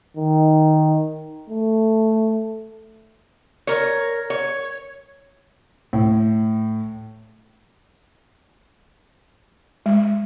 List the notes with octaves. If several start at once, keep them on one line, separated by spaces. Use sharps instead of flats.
D#3
A3
A#4 C#5
C#5
A2
G#3